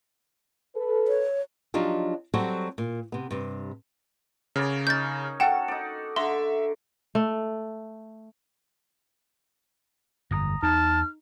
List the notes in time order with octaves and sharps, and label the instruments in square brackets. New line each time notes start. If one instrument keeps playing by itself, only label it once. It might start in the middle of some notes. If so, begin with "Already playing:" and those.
[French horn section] A4 B4
[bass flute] C#5
[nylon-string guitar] F3 F#3 D4 D#4 F4 G4
F#3 G3 C4 F#4 A4 C5
A#2
C3 B3
G2 C3
[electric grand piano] C#3 [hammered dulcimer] A#4 C#5 D5
[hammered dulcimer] C#4 D#4 [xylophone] G6 A6
[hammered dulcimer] F#4 A4 [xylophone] F#5 G5 [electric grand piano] E7
[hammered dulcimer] D#4 D5
[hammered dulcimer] D3 A#5 [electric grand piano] E5 [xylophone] C6
[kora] A3
[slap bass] G1 F2 [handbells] A#5 D#6 A#6
[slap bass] E2 [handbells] D#4 [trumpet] A5 [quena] F6